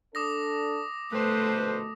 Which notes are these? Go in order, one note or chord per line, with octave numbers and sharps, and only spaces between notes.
D4 A4 D6 D#6 A#6
A#1 B2 D3 A3 B4 C5